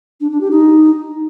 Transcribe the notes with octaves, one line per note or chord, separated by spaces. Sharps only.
D4
D4
G4
D#4